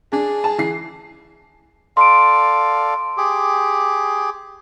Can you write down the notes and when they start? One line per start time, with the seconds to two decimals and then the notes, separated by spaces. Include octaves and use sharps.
0.13 D4 G#4
0.44 A5
0.58 E3 C7
1.97 A4 D5 F5 C6 D7
3.17 G4 G#4 D6